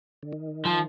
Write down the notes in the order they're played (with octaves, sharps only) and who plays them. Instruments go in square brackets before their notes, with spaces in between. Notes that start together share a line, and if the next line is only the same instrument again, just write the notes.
[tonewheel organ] D3
D#3
[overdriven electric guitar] F3